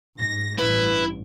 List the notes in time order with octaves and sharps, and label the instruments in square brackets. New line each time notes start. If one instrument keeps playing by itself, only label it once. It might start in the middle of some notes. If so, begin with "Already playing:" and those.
[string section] G#2 A#6
[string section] A1 G2 [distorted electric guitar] E4 [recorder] B4